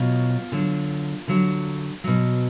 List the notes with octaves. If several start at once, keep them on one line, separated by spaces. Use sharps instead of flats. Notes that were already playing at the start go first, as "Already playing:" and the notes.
Already playing: B2 F#3 F4
D3 F#3
D3 F#3
B2 F#3